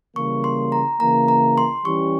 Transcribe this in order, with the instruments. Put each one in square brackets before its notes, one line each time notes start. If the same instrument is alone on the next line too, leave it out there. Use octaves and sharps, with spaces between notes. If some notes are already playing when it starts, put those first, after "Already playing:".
[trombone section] C#3 E3 G3 A#3 [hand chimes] C#6
[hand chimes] C6
A#5
[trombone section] C#3 E3 A#3 [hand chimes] A#5
[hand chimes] A#5
C6
[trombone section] E3 G3 C#4 G4 [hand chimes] C#6